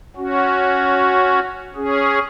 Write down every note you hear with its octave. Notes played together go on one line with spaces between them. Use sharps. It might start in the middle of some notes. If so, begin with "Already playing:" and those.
C#4 F#4
C#4 G#4